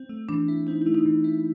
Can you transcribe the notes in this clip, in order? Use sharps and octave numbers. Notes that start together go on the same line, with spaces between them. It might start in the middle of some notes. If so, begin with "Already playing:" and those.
Already playing: C4
A3
E3 D4
E4
C4 D#4
A3 E4
D#4
E3
E4